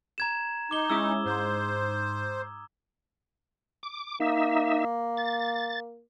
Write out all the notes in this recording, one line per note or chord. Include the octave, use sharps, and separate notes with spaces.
A#5 G#6 E7
D#4 D6 G7
G#3 C#4 E4 D#6 E6
G#2 C5
D6
A#3 D#4 E5
A6